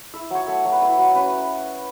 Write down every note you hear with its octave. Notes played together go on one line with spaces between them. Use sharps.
E4 E5
F#3 C#5
A3 E5
F#3
B4
E4 C#5
F#3
C#4 B4